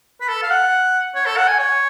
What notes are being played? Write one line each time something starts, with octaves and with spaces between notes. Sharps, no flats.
B4
A4
F5
F#5
C#5
A4
F#5
G#5
C#5